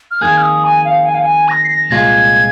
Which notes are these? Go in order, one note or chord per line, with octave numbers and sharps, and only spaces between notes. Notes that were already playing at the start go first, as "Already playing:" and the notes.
F6
F2 D#3 A#3 G#4 G#6
F6
D#6
G#5
F5
G#5
F5
G#5
A#6
C7
A#6
C2 A#2 F3 G#3 F4 G#6